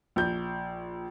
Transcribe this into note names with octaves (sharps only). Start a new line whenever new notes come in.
A#1 G6